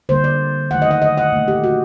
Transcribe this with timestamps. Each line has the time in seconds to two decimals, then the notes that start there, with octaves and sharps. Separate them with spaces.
0.09 D3 G3 A#3 C5
0.24 D5
0.71 D#3 F#3 A3 F#5
0.82 D#5
0.91 F#5
1.02 D#5
1.17 F#5
1.32 A#2 A3
1.48 G4
1.64 F#4